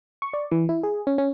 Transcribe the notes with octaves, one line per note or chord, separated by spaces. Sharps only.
C#6
D5
E3
E4
G#4
C#4
C#4